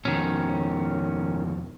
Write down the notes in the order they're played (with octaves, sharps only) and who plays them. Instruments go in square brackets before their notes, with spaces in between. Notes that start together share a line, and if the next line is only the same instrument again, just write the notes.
[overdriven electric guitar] F2 B2 [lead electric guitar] D#3 C#4